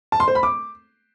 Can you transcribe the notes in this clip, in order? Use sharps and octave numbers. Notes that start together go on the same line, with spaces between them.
A5
C6
C5
B5
D6